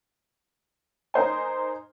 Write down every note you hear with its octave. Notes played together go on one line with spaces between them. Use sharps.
D#4 A#4 C5 G#5